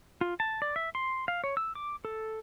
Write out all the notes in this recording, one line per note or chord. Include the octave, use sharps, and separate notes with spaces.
F4
A5
D5
E5
C6
F5
C#5
E6
D6
A4